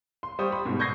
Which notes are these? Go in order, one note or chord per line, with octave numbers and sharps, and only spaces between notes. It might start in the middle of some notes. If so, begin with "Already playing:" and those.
C6
G3 C5 C#6 D#6
B5
G#2 B2
C#6 G6 G#6 A#6 C7